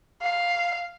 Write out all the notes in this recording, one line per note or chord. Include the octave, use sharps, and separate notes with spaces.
F5